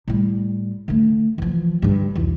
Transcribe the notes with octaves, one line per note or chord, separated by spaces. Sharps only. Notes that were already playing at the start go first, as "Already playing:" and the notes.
A2 G3
D3 A3
E3 F3
G2 D3
B1 E2